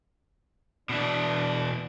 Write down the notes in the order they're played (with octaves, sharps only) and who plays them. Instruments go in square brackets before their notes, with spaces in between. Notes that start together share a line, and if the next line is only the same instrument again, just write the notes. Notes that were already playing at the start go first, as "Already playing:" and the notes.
[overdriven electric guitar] B2 E3 [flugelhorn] D4